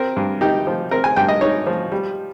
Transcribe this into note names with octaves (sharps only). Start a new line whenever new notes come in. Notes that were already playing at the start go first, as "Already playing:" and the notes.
Already playing: C4 A#4
G2
D#4 G4
F3
C4 A#4
G#5
G2 G5
D#5
D#4 C#5
F3
G3